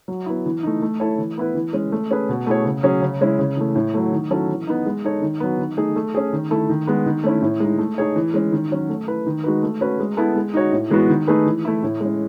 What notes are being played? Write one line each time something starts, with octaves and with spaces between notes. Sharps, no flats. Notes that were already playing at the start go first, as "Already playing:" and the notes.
F#3
B3 E4
E3
A3 D#4
A3
E4 A4 C#5
E3
B3 E4 B4
E3
G#3 C#4
A3
C#4 G#4 B4
B2
A3 E4 G#4 C#5
C#3
F#3 C#4 G#4
C#3
G#3 C#4 E4
C#3
E3 A3
A2
F#3 A3
D#3
F#3 C#4 E4 A4
E3
B3 D#4
G#3
D#4 A4 C#5
D#3
F#3 B3
D#3
A3 D#4 G#4
A3
C#4 G#4
D#3
A3 E4 A4
D#3
G#3 B3
D#3
A3 C#4 E4
A2
G#3 D#4
A3
D#4 G#4 C#5
E3
G#3 C#4
D#3
F#3 C#4 F#4
A3
E4 B4
D#3
G#3 D#4 F#4 B4
A3
C#4 F#4 B4
G#3
B3 E4 A4
G#3
D#4 F#4 C#5
A2
E3 G#3 B3 F#4
D#3
A3 D#4 G#4 B4
E3
A3 E4
A2
G#3 C#4